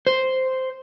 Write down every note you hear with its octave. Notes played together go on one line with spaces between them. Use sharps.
C5